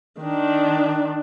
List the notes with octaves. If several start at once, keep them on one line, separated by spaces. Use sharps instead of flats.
D#3 D4